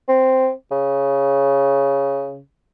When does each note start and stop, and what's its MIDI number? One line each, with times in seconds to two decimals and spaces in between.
0.09 0.50 60
0.71 2.39 49